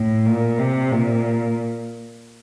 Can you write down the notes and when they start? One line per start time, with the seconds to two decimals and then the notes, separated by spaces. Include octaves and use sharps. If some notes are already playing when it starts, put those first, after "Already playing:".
Already playing: A2
0.26 A#2
0.58 C3
0.91 A#2